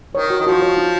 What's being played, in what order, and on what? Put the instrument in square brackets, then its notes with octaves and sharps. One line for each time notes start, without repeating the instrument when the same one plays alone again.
[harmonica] D#3 [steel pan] C#5
[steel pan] F#4
[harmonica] D#3
[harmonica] F3 [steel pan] F#4
[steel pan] C#5
D#4